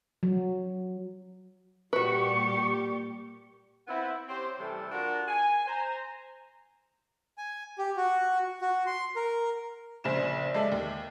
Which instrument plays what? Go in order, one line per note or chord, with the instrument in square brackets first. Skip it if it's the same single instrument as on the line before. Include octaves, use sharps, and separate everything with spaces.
[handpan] F#3
[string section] A#2 G3 G4 [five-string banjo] F#4 B4 [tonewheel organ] C#6
[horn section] B3 C4 E4
C4 C#4 G4 C5
C3 E3 G3 A3 A4
D4 F4 F#4 A#4
G#5
C5 A#5
[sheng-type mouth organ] G#5
G4
F#4
F#4
C6
A#4
[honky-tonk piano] A#1 C#3 C5 E7
G#3 A4 D5 E5
D#2